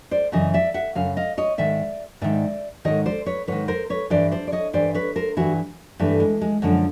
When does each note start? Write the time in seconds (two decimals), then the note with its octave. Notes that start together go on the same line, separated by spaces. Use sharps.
0.11 C5 D5
0.32 F#2 C#3 E3 D#5
0.54 D5 E5
0.74 E5 F#5
0.95 F#2 C#3 F5
1.17 D#5 F5
1.38 C#5 D#5
1.58 G#2 D#3 D5 E5
2.21 G#2 D#3 D5 E5
2.85 G#2 D#3 C#5 D#5
3.06 C5 D5
3.26 B4 C#5
3.47 G#2 D#3 B4 C#5
3.68 A#4 C5
3.90 B4 C#5
4.10 G2 E3 C5 D5
4.32 C5 D5
4.47 D5
4.52 C#5 D#5
4.73 G2 E3 C5 D5
4.94 B4 C#5
5.16 A#4 C5
5.37 G2 E3 E4 F#4
5.99 G2 E3 A3
6.20 G#3
6.41 G#3
6.62 F#2 D3 F3 G#3